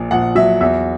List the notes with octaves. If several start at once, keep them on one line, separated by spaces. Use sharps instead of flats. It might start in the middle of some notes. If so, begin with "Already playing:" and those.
Already playing: A#1 A#2
A#1 F#5
F#3 E5
E2 E5